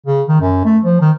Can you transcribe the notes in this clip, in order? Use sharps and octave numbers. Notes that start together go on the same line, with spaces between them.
C#3
D#3
F#2
A3
F3
D#3